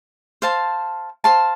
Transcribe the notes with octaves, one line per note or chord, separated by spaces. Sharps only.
C5 F5 A5 C6
C5 F5 A5 C6